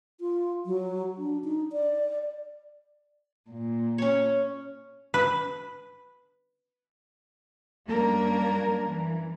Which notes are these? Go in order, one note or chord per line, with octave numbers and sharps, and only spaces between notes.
F4
F#3
D4
D#4
D5
A#2
C#4 C#5
B4
F#2 F#3 G3 A#3 D4 A#4
E3